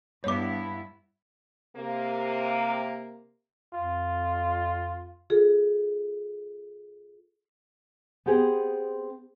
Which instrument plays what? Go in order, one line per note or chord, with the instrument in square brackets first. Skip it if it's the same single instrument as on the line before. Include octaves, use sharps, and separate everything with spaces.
[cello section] G2 B3 E4 [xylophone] C#5 D6
[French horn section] C3 A#3
[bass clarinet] F2 [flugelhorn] F4
[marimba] F4 G#4 A4
[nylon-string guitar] B3 C4 G4 G#4